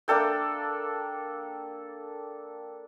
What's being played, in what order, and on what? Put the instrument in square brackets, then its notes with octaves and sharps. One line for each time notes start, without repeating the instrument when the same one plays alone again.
[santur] A#3 D4 A4 G5